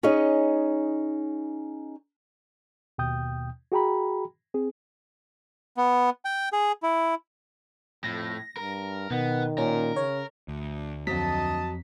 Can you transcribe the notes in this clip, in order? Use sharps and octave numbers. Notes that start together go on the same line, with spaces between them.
C#4 D#4 G#4 C#5 D#5
D#2 B2 G5 D#6 G6
F#4 G#4 G5 A#5 B5
C4 G#4
B3
G5
G#4
E4
F2 A2 A#6
G2 A#4
B2 D#3 B3
A#2 C#4 A#4
C#3 C#5
D2
F2 F#3 D#5 A5 B6